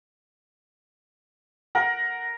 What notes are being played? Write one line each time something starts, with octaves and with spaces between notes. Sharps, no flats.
A#4 F#5